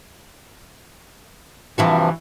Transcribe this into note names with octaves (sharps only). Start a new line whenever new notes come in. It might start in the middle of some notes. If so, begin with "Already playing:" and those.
G2 C3 E3 F3 E4 F#4